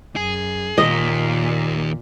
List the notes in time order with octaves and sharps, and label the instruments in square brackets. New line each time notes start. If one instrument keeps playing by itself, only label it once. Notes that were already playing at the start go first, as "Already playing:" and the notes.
[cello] F#2 [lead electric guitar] G#4
[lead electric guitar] D#2 [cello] A#2 [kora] D#5